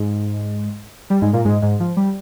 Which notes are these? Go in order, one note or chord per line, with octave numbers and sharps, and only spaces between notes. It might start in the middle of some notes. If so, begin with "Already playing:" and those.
Already playing: G#2 G#3
G3
G#2 G#3
A#2 A#3
G#2 G#3
G#2 G#3
F3
G3